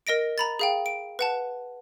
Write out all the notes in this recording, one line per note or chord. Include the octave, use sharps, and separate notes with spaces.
A#4 D#5 A#6 D7
A#5 B5 A6
G#4 F5 G5
D7
B4 F#5 A5